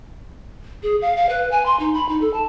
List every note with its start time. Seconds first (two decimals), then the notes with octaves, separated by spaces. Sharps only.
0.83 G#4
1.02 F5
1.17 F5
1.29 B4
1.51 G#5
1.66 C6
1.79 D#4
1.94 B5
2.09 D#4
2.21 A4
2.34 A5